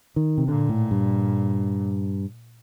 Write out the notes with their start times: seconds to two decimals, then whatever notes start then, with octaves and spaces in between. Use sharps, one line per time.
0.16 D#3
0.38 C3
0.48 A#2 D3
0.69 A2
0.91 G2